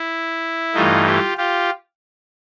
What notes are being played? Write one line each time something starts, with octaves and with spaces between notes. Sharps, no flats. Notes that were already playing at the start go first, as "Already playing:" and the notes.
Already playing: E4
G2 E3 A3 D#4 F4
F4 G4
F4 G4